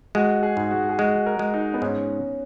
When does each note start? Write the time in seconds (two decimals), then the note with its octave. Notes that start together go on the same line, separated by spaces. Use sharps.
0.15 G#3 F#4
0.43 G#4
0.57 G#2
0.71 F#4
0.89 G#4
0.98 G#3 F#4
1.26 A#4
1.39 G#3
1.54 D#4
1.74 B3
1.82 G#2 C#4